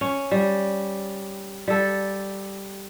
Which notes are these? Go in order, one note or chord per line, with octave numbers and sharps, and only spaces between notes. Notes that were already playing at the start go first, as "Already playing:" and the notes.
C#4
G3
G3 A4